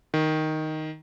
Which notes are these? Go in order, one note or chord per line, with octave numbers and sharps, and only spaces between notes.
D#3